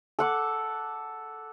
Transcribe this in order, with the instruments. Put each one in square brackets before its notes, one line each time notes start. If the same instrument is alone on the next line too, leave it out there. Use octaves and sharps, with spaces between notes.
[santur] A4 F#5 D6